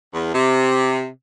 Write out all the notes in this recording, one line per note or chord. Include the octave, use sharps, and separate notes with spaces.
E2
C3